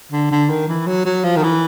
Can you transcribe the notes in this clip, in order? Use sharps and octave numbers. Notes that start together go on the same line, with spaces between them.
D3
D3
D#3
E3
F#3
F#3
F3
D#3
E3